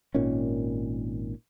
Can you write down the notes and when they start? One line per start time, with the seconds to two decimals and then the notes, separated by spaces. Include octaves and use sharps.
0.14 G#1 A#2 D#3 C#4